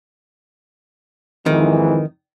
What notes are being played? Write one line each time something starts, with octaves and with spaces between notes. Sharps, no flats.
F2 G#2 D#3 E3